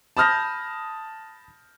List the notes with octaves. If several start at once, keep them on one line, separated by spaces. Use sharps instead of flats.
A5 B5 D#6 F6 G6 A#6